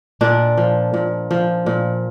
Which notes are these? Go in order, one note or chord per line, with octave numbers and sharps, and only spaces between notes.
A#2 D4
F3
A#2
F3
A#2